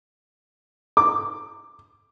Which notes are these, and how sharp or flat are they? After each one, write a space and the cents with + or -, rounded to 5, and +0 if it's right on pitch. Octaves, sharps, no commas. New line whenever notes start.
D6 +5